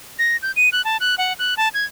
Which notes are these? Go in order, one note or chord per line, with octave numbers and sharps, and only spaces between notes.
A#6
G6
D#7
F#6
A5
F#6
F#5
F#6
A5
G#6